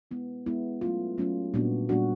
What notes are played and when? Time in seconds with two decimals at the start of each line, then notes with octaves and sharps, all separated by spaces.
0.11 G#3 B3 E4
0.46 G#3 B3 E4
0.81 F#3 A3 C#4 F4
1.18 F#3 A3 C#4 F4
1.54 A#2 G3 B3 D4 F#4
1.89 A#2 G3 B3 D4 F#4